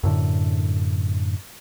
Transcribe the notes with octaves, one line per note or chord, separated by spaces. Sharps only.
F#2 A2 D3